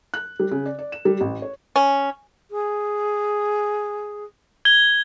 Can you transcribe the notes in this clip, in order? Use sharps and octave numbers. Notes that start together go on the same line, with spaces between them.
F#6
G3
C#3
D5
D5
E7
G3
A1
C#5
C#4
G#4
G#6 G7